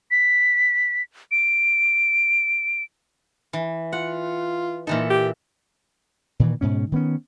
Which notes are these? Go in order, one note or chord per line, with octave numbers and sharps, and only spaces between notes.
B6
D7
E3
F4 F#5
A#2 E3 D#4 A4
G4
A#2 D#3 E3
G#2 B2 C#4
D#3 B3 C#4